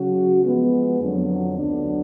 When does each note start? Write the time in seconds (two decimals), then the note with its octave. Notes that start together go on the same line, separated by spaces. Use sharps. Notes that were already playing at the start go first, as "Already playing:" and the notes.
Already playing: C#3 F#3 C#4 F#4
0.42 F3 G#3 B3
0.99 F2 D3 F#3
1.56 D2 D3 F#3 B3 D4